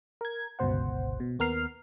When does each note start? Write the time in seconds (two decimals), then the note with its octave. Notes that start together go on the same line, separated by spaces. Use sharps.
0.21 A#4 G#6
0.59 G1 C#2 B2 C5 F#5
1.20 B2
1.39 D#2 B3 A#4 F6 C7